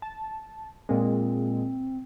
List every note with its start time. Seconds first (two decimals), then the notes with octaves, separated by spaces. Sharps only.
0.02 A5
0.89 A#2 G#3 C4